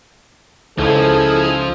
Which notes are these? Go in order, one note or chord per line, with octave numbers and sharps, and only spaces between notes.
C#2 F3 D#4 E4 G#4 A4